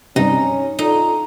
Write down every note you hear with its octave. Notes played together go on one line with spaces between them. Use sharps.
G2 C3 C#4 D#4
D#4 F4 A4